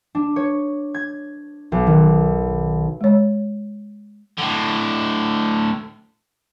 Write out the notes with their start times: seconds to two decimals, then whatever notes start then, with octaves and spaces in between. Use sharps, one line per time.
0.15 D4
0.36 C#5
0.94 G#6
1.72 B1
1.87 D#3
3.01 G#3 C#5
4.38 A2 D3